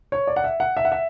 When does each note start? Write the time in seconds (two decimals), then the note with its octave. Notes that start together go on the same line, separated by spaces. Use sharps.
0.12 C#5
0.27 D5
0.36 F#5
0.44 E5
0.60 F#5
0.77 E5
0.85 F#5
0.92 E5